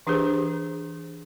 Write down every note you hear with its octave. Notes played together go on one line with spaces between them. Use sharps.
E3 D4 G4 G#4 C5